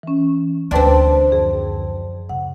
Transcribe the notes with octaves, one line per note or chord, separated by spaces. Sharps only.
E3 C#4
D2 C4 D4 B4 G5 C6
F#2 F3 G#4
C#3 F#5